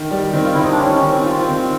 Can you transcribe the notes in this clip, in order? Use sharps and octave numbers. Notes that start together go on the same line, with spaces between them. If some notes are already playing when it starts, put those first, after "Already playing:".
Already playing: D#3
G3
D#3 C4
F4
D#3 E4
D#4
D4
D#3 C#4
D#3
C4
F4
C4
D#3